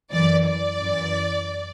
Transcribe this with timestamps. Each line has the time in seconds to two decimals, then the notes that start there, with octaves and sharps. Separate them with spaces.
0.12 F#2 E3 D5
0.46 D5
0.81 F#2 E3